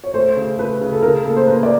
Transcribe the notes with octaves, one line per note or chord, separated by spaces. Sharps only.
C#5
A3 C5
C#3
A3 B4
C#3
A4
C#3 A#4
A#3 A4
C5
A#3 B4
D5